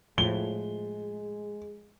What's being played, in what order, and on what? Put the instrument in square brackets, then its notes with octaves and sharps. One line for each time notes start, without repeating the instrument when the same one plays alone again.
[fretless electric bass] A2 [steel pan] F3 [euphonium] G#3 [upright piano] G7